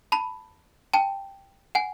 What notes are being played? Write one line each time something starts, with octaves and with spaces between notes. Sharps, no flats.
A5 B5
G5 A5
F#5 G#5